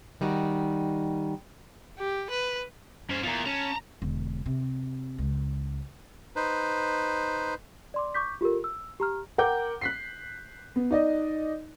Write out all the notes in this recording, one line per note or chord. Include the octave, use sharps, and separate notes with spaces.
D#3 G3 D#4 F#4
G4
B4
G2 C#4 C5
E2 F4 A#4
C#4 A5 A#5
E1 D3
C3
C#2
D#4 B4 C5
D5 C6 D6
C#6 D6 G6 B6
F4 G4 A4 A#4
E6
G4 A#5 F6
A#4 F#5 G5 D6 G6
F#6 B6 C7
B3
D#4 D5 D#5